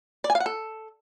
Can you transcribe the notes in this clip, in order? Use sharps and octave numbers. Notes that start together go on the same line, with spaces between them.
D5
G#5
F5
F#5
A4